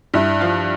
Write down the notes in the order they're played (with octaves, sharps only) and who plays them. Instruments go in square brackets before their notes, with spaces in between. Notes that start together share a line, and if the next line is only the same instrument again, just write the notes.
[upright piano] G2 E4
F3 F4